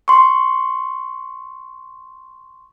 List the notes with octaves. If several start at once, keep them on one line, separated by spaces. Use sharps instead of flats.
C6 C#6